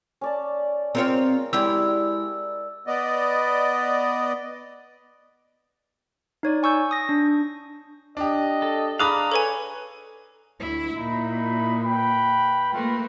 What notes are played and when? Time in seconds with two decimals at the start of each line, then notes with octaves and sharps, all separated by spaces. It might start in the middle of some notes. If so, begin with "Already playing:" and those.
0.21 C#4 D5 A5
0.95 G#3 C4 F4 A#4 C#5
1.53 G#3 E4 G4 D5 E6
2.87 B3 D5 D#5
6.43 D#4 C#5 D5
6.63 G#5 C#6 E6 G6
6.91 D#6 A#6
7.09 D4
8.17 D4 G4 D#5
8.62 A4
8.99 D4 G#4 F5 A#5 B5 D6 D#6 F#6
9.32 A4 B4 C#5 G#5
10.60 D2 E4
10.96 A#2 D#4 E4 B5
11.83 B4 G5 B5
12.73 A3 A#3 F4 B4